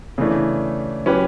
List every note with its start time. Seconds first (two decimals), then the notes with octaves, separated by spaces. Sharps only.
0.18 C#3 E3 A3 D4
1.06 F#3 C#4 G4 B4